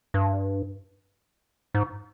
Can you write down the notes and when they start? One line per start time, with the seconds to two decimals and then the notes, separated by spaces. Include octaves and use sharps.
0.14 G2
1.75 G#2